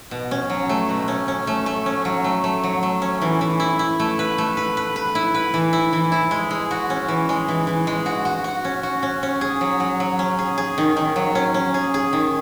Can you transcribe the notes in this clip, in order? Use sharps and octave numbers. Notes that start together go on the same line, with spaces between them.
B2
C#4
F#3
A3
B2
C#4
C#4
A3
A3
C#4
F#3
A3
A3
F#3
A3
C#4
E3
E3
E4
E4
A3
B4
A3
B4
B4
B4
E4
B4
E3
E4
E3
E4
G#3
G#3
F#4
C#4
E3
G#3
E3
E3
G#3
F#4
F#4
F#4
C#4
F#4
C#4
C#4
G#4
F#3
F#3
F#3
C#4
G#4
G#4
D#3
D#3
F#3
C#4
C#4
G#4
G#4
D#3